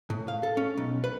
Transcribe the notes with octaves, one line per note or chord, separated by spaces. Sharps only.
A2
F5
A4
C#4
B1
B4